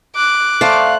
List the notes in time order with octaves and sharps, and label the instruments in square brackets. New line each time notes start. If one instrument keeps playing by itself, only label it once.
[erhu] D6 [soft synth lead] F#6
[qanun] A3 C5 D5 [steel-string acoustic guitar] F5